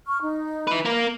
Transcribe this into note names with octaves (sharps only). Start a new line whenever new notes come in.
C#6 F6
D#4
E4 B4
A#3 A#4